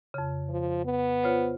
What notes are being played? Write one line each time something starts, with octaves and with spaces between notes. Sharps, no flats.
F2 C#3
F3
B3
F4 C5 C#5